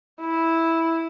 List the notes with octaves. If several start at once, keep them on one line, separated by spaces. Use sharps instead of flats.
E4